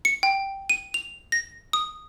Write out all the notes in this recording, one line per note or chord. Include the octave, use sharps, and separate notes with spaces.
C#7
G5
D#7
F7
A#6
D#6